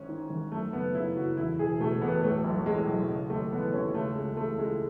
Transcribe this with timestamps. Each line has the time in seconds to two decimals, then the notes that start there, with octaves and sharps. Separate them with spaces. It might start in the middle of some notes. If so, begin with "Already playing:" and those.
Already playing: G#1 G#2 C#4
0.09 D#3
0.30 G#1
0.51 F#2 A3
0.72 F#1 B3
0.95 C#3 E4
1.16 F#1 F#4
1.37 E2 E4
1.59 E1 G#4
1.80 B2 A3
2.02 E1 B3
2.24 A2 A3
2.44 B1
2.66 E3 G#3
2.87 B1
3.09 C#3
3.30 D#2 A3
3.52 E3 B3
3.73 D#2 C#4
3.94 C#3 A3
4.16 C#2 G#3
4.37 E3 A3
4.58 C#2 G#3